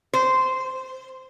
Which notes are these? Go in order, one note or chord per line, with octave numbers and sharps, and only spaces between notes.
C5